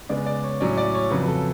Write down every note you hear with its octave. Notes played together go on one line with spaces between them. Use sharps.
C#3 G#3 B3 D5
D5
C#5
A2 F#3 C#4 D5
D5
C#5
F2 C#3 F#3 B4
B4
A4